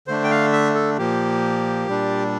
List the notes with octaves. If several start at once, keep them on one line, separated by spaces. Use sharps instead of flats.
D3 A3 D4 C5
G5
F5
E5
A4
A#2 F3 A#3 G4
A#2 G3 D4